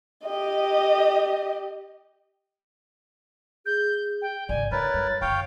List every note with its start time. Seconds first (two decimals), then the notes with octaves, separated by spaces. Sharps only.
0.24 G4 D#5
3.66 G#4 G6
4.22 G5
4.49 G#1 C#3 D5 G#5
4.72 D4 E4 A#4 B4 C#5 A6
4.94 G2
5.21 F#1 D3 C#5 F5 G5